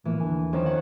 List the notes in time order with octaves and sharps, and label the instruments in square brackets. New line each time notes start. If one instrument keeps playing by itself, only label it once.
[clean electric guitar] A2 F3 A#3 [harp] E3
[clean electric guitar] D#2 D3 G#5
[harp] F2 D#3 C#4
F#5